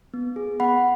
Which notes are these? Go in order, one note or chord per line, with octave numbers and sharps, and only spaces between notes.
B3
G#4
B3 F#5 B5